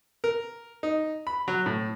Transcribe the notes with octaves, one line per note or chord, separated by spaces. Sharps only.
A#4
D#4
B5
F#3
A2